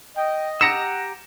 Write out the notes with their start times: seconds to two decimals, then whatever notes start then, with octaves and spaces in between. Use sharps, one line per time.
0.17 D#5 G5
0.61 G4 F#5 A#5 E6 A#6 C#7 E7